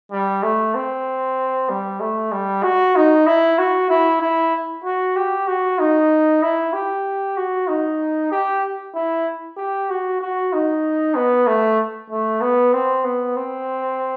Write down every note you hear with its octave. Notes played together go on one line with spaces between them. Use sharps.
G3
A3
C4
G3
A3
G3
F#4
D#4
E4
F#4
E4
E4
F#4
G4
F#4
D#4
E4
G4
F#4
D#4
G4
E4
G4
F#4
F#4
D#4
B3
A3
A3
B3
C4
B3
C4